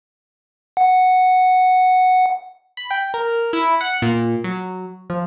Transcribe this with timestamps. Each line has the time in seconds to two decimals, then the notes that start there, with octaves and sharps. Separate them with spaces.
0.77 F#5
2.77 B5
2.91 G5
3.14 A#4
3.53 E4
3.81 F#5
4.02 A#2
4.44 F#3
5.10 F3